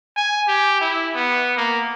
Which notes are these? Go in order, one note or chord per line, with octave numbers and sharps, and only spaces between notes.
G#5
G4
E4
B3
A#3